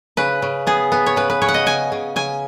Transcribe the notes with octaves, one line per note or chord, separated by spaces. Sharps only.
C#3 B4
C#3
B3 G#4
B3
C#5
C#3 B4
B4
C#3 C#5
F#5
D#5
C#3 G#5
C#3
C#3 G#5